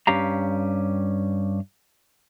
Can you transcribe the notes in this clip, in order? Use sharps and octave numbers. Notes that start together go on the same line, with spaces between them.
G2 C#4 G4 F5 A#5